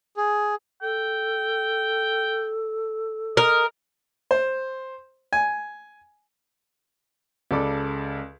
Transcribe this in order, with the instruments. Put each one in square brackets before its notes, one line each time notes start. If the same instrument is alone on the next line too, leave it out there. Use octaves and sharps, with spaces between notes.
[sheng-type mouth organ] G#4
[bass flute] A4 [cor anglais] G5
[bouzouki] A#4 [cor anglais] D#5
[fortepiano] C5
G#5
[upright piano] C#2 C#3 A4 D5 D6